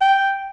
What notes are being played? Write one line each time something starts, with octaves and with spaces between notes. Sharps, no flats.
G5